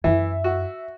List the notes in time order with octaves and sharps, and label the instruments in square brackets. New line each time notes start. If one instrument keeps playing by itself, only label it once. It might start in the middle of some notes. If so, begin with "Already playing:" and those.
[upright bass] F#2 E4 [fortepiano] E3 [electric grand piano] E5
[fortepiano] F#4